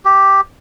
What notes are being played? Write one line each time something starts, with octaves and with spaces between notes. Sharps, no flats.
G4